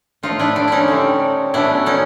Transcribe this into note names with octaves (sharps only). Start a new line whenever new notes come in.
A2 F3 A3 D#4 F4
D4 E4
D4
C#4 D#4 E4
D3 G3 C4
B2 F#3 A3 C#4 D4 E4
C#4 D#4